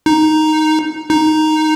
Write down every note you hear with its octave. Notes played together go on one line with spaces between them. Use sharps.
D#4
D#4